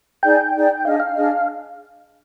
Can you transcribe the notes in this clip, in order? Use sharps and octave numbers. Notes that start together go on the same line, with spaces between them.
D#4 G#4 D5 G5
D#4 G#4 D5
D4 G#4 D#5 F5
F5
D4 G#4 D#5